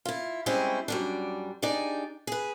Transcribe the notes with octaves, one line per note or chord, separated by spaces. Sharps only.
E4 F4
G3 G#3 C4 C#4 E4 G4
F#2 G3 D4
D4 D#4 G4 G#4 D5
G#4 B4